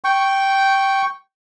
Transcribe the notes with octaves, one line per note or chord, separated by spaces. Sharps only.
G5 C#6